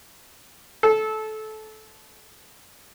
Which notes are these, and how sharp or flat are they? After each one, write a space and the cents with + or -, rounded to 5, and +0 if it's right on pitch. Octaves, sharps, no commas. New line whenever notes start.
A4 -20